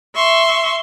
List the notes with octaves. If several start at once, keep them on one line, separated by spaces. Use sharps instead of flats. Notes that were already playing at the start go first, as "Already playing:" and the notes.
E5 C6 C#6